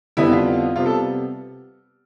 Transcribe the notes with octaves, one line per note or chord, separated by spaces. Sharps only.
F2 D3 G3 B3 E4
F4
C3 G3 B3 F4
A4